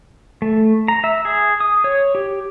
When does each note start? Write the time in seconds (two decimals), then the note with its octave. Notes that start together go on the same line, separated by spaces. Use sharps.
0.42 A3
0.88 A#5
1.04 E5
1.25 G#4
1.60 D#6
1.84 C#5
2.15 G4